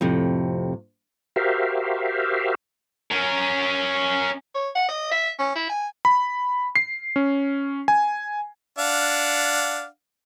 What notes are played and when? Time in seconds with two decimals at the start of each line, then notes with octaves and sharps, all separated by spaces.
0.01 F2 A2 C3
1.36 F#4 G4 A#4 C5 E5 F5
3.12 C#4 A#4
4.55 C#5
4.75 F#5
4.88 D#5
5.11 E5
5.39 C#4
5.55 E4
5.69 G#5
6.05 B5
6.76 C7
7.16 C#4
7.88 G#5
8.79 D4 F5 F#5